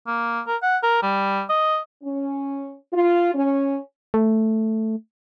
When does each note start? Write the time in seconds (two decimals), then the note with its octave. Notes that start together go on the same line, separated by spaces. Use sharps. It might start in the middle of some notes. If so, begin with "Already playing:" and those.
0.07 A#3
0.47 A#4
0.63 F#5
0.83 A#4
1.03 G3
1.49 D#5
2.03 C#4
2.93 F4
3.34 C#4
4.14 A3